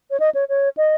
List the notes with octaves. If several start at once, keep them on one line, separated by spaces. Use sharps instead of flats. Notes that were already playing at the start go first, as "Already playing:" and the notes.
C#5
D#5
C#5
C#5
D#5